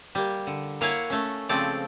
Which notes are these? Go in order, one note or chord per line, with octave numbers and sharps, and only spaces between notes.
G3 A#3
D3
A#3 E4 C#5 F5 F#5 G#5
A3 C#4
C#3 F3 G#3 A3 C4 D5